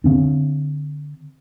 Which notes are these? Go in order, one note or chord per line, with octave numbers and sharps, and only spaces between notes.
D3 C4 D4